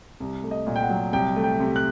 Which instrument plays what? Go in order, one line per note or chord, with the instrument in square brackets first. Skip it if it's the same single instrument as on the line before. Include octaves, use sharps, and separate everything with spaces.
[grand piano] C2
A3
D#5
A#2
G5
F#5
F#3
C2 G5
A3
G5
C3
F#6